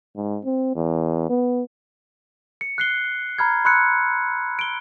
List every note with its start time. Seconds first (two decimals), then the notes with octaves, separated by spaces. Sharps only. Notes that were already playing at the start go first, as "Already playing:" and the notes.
0.16 G#2
0.45 C4
0.76 E2
1.30 B3
2.61 C#7
2.78 F#6 C7 G7
3.38 A#5 B5 F6 G#6
3.65 B5 C6 E6 F#6 G#6 C#7
4.59 D7 G7